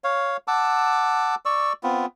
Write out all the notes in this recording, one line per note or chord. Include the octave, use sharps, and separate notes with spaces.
C#5 F5
F#5 A5 D6 E6
D5 C#6 E6
B3 C4 F4